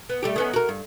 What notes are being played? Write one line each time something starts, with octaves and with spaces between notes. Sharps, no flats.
B3
G3 A3 G4
D#3 B3 C#4
F#4 A#4
G2